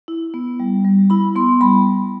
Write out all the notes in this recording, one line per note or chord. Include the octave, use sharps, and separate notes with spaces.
E4
B3
G3
G3
E4 B5
B3 C6
G3 B5